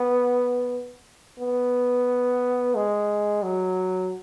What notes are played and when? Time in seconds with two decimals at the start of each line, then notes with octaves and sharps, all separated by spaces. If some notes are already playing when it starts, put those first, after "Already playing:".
Already playing: B3
1.39 B3
2.75 G#3
3.43 F#3